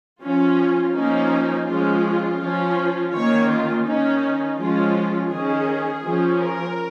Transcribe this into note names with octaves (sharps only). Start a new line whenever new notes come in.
F3 C#4 F4
F3 A#3 C#4 D#4
F3 G#3 C#4 F4
F3 C#4
D#3 A#3 C#4 C#5
F4
D#3 C#4 D#4
F3 G#3 C#4 F4
D#3 C#4 G#4
F3 C#4
A#4